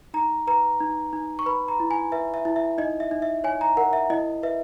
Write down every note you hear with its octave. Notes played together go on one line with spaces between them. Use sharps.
D#4 A#5
B4 A#5
D#4
D#4
C#6
B4 B5
A#5
E4
G#5
B4 E5
E5
E4
E5
D#4 D#5
E5
D#4
E5
C#5 G#5
A#5
A#4 F#5
E5
E4 D#5
B4 E5